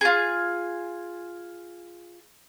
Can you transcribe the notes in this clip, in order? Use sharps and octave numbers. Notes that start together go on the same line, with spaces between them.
F4 G#4